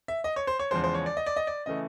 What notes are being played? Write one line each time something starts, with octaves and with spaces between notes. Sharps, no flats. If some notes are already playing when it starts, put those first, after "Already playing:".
E5
D#5
C#5
C5
C#5
E2 C#3 F3 G#3 C5
C5
C#5
D5
D#5
D5
D#5
D5
C#3 E3 A3 D#5